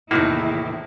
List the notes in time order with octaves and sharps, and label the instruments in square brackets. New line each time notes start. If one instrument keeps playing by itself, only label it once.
[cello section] E2 D#3 E4 [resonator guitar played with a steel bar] A2 C3 D#4 [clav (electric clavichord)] A#3 F#4